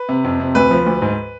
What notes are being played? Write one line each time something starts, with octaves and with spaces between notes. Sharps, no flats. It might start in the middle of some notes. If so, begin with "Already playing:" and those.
Already playing: B4
C3
F2
C3
D2 B4
F3
D2
G#2